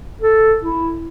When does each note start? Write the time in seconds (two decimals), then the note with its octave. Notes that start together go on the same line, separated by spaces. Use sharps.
0.22 A4
0.63 E4